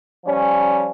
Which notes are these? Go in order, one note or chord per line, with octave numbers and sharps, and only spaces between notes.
F3 G3 C#4